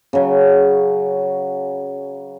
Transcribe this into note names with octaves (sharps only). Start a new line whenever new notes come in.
C#3 F#3